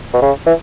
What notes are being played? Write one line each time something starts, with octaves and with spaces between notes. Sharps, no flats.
B2
C#3
E3